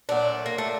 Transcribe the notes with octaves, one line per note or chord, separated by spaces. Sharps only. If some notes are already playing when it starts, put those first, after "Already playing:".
A#2 F#3 A3 D4
A#3
A3